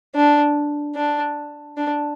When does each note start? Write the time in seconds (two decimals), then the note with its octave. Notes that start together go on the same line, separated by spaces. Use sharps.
0.15 D4
0.95 D4
1.77 D4